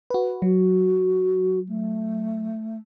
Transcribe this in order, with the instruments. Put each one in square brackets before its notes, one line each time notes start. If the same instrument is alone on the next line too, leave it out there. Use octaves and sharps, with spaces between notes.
[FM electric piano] F#4 B4
[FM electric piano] F#3 [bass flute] F#4
[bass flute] A3